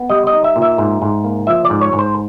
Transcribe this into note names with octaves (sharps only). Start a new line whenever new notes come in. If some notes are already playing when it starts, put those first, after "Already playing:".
Already playing: B3
G3 D#5
D#5
D#4
E5
A#2
E5
G#2
G#2
A#3
F3 E5
D5
G#2
C#5
G#2
C5